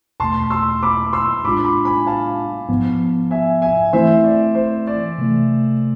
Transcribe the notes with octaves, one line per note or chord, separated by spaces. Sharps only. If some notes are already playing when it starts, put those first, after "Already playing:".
E2 B2 A3 A5 C6
C6 E6
B5 D6
C6 E6
A2 G#3 D4 F4 B5 D6
B5 D6
G#5 B5
F5 A5
G#2 F3 B3
E5 G#5
E5 G#5
E3 A3 C4 E4 C5 E5
D5
C5
D5
C3 E3 A3